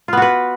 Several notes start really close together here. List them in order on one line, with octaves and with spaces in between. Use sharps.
F4 B3 F#4 B4